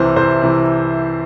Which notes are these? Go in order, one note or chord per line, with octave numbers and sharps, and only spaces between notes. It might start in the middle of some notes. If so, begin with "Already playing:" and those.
Already playing: C2 C3 E3 C5
C2 C5
C3 E3